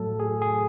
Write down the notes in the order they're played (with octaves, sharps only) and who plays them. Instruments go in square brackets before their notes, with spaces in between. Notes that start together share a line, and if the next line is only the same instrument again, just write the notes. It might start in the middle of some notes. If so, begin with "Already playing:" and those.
Already playing: [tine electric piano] A2 F#3 A3 A4
G#4
G#4